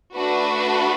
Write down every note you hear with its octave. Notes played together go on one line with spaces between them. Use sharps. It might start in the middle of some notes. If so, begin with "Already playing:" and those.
A3 D4 F#4 B4